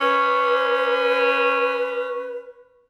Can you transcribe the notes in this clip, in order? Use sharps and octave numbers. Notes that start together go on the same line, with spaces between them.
C#4 B4